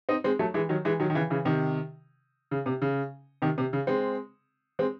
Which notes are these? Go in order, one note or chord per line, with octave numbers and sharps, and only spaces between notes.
C4 D#4
G#3 C4
F#3 A3
E3 G#3
D#3 F#3
E3 G#3
D#3 F#3
D#3
C#3 E3
C#3 E3
C3 D#3
C#3
C3
C#3
C3 D#3
C3
C#3
G#3 C4
G#3 C4